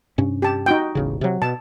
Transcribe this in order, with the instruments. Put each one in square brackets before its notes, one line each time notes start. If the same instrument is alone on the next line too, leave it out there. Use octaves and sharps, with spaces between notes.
[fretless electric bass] G2 C3 C#4
[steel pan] G4 A5
D#4 F#4 G5
[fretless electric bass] E1 A1 C#3
C3 F#3
[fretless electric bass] B2 [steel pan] A5